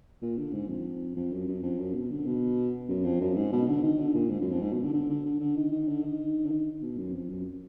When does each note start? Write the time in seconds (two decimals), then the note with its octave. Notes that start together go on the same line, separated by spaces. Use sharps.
0.22 A#2
0.38 D3
0.53 G#2
0.69 F2
1.16 F2
1.32 F#2
1.48 F#2
1.63 F2
1.79 F#2
1.95 B2
2.11 D3
2.26 B2
2.89 F#2
3.05 F2
3.21 F#2
3.36 G#2
3.52 B2
3.68 D3
3.83 D#3
3.99 D3
4.15 A#2
4.31 G#2
4.41 F#2
4.52 F2
4.62 G#2
4.73 B2
4.83 D3
4.94 D3
5.09 D3
5.25 D3
5.40 D3
5.57 D#3
5.72 D#3
5.88 D3
6.04 D#3
6.46 D3
6.51 D#3
6.82 B2
6.98 F#2
7.14 F2
7.29 F#2